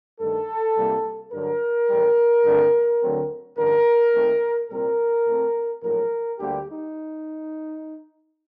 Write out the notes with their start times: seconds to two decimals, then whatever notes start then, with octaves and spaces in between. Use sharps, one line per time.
0.20 G2 D#3 A3 A4
0.76 C2 C3 G3 A#3
1.32 G2 D3 F#3 A#4
1.89 A1 A2 G3
2.45 G2 D3 A3 C4
3.01 D2 D3 F#3 A3 C4
3.58 A1 G2 D3 A#4
4.14 D#2 D#3 A3 C4
4.70 C2 A#2 G3 C4 A#4
5.27 A2 A3 C4
5.82 A#1 A2 F#3 A#4
6.39 D2 D3 G3 A#3 G4
6.67 D#4